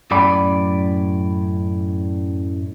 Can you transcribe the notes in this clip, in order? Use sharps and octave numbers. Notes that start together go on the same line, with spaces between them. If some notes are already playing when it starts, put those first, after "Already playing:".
F#2 A2 D5 B5